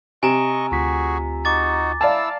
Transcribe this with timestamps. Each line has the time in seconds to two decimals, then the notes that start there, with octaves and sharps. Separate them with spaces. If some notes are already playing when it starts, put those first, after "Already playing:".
0.23 C3 D#5 G#5 A#5 C#6
0.72 D2 F4 F#4 G#4 B6
1.45 D#4 F#4 D6 A6
2.01 E4 D5 F5 A5 E6